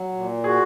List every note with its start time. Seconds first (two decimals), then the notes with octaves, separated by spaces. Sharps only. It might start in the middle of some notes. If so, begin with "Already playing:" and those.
Already playing: F#3
0.13 A#2
0.44 F#4 G#4